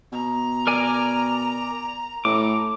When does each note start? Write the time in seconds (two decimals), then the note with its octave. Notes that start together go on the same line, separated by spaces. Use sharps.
0.12 B2 A#5
0.67 A#4 D5 G#5
2.25 A2 D6